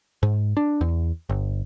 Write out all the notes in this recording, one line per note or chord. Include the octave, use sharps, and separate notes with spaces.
G#2
D4
E2
G1